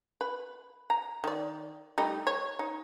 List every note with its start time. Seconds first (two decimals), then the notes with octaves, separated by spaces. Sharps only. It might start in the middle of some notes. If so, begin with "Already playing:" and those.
0.21 B4
0.90 A#5
1.24 D#3 D5
1.98 G3 A3 D#4
2.27 C#5
2.59 D#4